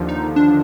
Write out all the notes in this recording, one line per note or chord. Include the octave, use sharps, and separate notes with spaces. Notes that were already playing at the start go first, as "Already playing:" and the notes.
Already playing: D#2 D3 F3
D#4
D4